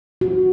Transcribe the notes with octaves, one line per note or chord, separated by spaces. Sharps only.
F#4